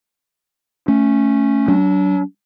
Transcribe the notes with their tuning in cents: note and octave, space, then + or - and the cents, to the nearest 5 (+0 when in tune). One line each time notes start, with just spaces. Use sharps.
A3 +0 C#4 +0
F#3 +30 D4 -30